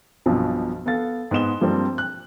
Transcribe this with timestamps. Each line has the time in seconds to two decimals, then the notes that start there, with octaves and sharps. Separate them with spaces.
0.26 B1 G2 B2 F3
0.86 B3 A4 F5 A6
1.31 G#2 B3 D#5 E7 G7
1.61 G2 F3 G3 G#3 A#3 C4
1.98 F#6